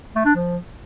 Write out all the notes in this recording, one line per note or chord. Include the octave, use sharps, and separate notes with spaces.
A3
D4
F3